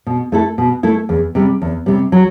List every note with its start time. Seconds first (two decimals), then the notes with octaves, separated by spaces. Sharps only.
0.07 B2
0.32 A3 E4 A4
0.58 B2
0.83 A3 E4 A4
1.09 E2
1.35 C3 G3
1.62 E2
1.86 C3 G3
2.12 F#3